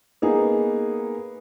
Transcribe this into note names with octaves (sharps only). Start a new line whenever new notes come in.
A#3 B3 D#4 G#4